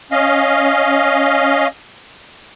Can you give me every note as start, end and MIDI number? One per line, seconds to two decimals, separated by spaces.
0.11 1.67 61
0.11 1.67 75
0.11 1.67 77